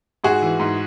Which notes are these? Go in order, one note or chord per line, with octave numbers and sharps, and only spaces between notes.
G#2 F#4 G#4
E3
G#2